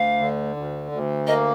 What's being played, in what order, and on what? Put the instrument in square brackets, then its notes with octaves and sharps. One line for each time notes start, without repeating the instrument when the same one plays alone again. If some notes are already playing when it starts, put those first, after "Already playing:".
Already playing: [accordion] D2 [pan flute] F5
[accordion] D3
D2
D2
[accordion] A#3 [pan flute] D#5